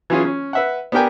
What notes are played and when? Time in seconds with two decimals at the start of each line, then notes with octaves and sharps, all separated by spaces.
0.10 E3 F#3 C#4 F4 G#4
0.25 C#4
0.53 B4 E5 F#5
0.92 B3 D4 G4 A#4 G5 G#5